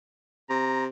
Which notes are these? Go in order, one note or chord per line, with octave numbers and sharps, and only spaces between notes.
C3 A#5